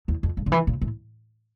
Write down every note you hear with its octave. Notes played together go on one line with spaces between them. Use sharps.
E2
F2
G2
D3
E3
A#2
A2